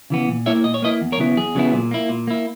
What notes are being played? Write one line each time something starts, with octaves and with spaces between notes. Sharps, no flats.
C#3 E3 B3
A#2
A#3 E4 C#5 E5
A#2 D#5
C#5
A#3 E4 B4 D#5
E2
A#4 C#5
C#3 F#3 B3 E4
E2 G#4
C#3 F#3 B3 E4
A#2
A#3 E4
A#2
A#3 E4